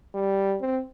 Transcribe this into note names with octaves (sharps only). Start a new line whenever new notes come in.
G3
C4